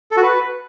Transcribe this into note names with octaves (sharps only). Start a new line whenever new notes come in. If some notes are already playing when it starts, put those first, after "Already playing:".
A4
F#4
B4